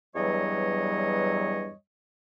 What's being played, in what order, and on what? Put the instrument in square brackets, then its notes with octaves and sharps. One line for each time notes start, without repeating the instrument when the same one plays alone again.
[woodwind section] E2 G2 F#3 G3 C#5 D#5